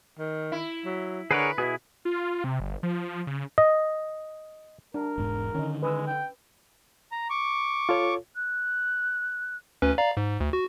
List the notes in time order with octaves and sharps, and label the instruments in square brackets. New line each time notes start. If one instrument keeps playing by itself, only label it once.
[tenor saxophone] D#3
[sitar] E4
[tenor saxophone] F#3
[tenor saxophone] D3 [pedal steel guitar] G#4 A#4 C#5 [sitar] B4
[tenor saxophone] B2 [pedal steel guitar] E4 G#4
[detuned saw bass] F4
C3
G1
F3
C#3
[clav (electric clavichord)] D#5
[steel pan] D4 [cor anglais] A#4
[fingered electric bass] E1 G#2
[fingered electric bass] D3 D#3 [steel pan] C#4 D#5
[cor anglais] G#3 [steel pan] B4 D#6 E6
[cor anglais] G5
[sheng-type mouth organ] A#5
C#6 D6
[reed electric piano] F4 A4 C#5
[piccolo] F#6
[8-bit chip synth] D2 C#4 B4
D5 F5 A#5
G#2
D2
F#4